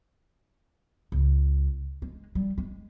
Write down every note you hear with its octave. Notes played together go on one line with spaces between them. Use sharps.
C#2
G#3
G3
G#3